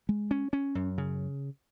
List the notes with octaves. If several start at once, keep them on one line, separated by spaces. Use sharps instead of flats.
G#3
C#4
C#4
F#2
C#3